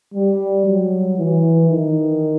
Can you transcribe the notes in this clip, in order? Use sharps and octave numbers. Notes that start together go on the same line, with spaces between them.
G3
F#3
E3
D#3